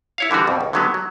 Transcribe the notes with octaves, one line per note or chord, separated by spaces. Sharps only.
E4 C#5 F5
D3 E3 G3 F#4 A#4
F2 B2
C#2
D3 D#3 F#3 G#3 B3
F#3